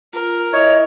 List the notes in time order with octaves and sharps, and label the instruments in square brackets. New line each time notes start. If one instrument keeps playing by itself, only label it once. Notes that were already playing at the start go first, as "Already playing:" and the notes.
[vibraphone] F4 [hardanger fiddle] A#4
[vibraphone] E4 E5 [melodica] C#5 [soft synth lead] D#5